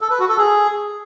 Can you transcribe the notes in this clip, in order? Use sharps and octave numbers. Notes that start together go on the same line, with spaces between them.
A4
B4
F#4
A4
G#4